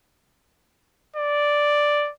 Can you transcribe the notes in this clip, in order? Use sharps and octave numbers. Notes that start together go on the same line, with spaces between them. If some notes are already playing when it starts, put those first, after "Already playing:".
D5